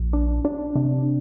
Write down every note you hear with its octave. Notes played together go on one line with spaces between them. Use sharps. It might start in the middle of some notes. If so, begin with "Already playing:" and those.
Already playing: A#1
D4
D4
C3